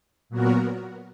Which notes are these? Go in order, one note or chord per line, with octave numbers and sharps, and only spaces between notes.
A#2 F#3 B3 F#4 A#4